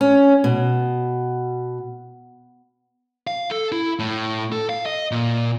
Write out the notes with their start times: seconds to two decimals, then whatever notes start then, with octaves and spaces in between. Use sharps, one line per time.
0.01 C#4
0.44 B2
3.27 F5
3.51 A4
3.72 E4
3.99 A2
4.52 A4
4.69 F5
4.86 D#5
5.11 A#2